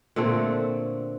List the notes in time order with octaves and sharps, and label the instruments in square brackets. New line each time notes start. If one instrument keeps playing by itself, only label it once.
[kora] A#2 D3 A3 C4